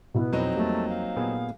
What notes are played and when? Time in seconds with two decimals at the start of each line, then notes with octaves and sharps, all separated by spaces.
0.14 B2 B3 E4
0.32 F2 F#3 C4 D#4
0.55 G3 A3 A#3
0.89 F5
1.16 A#2 B3 G#4